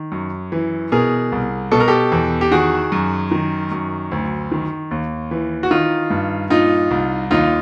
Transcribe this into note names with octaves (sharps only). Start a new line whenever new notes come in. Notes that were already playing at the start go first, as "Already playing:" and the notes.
Already playing: D#3
F#2
E3
B2 G#4 A#4
C2
B2 A4
A#4
G4 A4
E2
G4
D#3 F#4 G#4
F#2
D#3
F#2
D2
D#3
D#2
E3
F#4
D#3 D#4 F4
G2
A#2 D#4 F4
C2
D#2 D#4 F4